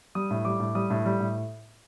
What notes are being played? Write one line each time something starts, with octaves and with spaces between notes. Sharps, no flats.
G3 D#6
A2
G3 D6
A2
G3 D#6
A2
G3
A2